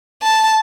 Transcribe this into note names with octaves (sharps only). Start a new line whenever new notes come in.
A5